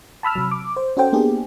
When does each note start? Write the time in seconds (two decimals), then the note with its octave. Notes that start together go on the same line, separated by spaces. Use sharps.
0.23 A5 B5 E6 F6
0.36 C3 F#3
0.51 D6
0.77 C5
0.97 C#4 F#4 A4 C5 G5
1.12 A#3 B3 D4 G4 G#4